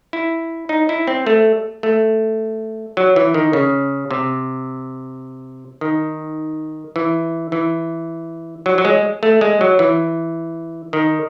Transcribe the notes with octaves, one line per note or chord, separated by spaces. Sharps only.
E4
D#4
E4
C4
A3
A3
F#3
E3
D#3
C#3
C3
D#3
E3
E3
F#3
F#3
G#3
A3
G#3
F#3
E3
D#3